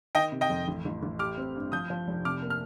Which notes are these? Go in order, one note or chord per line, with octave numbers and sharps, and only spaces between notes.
D#3 D#5 G5
C3
D#5 G5
F2
A1
A1
A1
G4 D6 F6
C4
G2
F3 D#6 G6
F3
F1
C3 D6 F6
A#3
F6